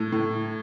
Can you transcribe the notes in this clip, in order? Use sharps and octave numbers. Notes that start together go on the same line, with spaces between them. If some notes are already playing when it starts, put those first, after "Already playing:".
Already playing: A2
A2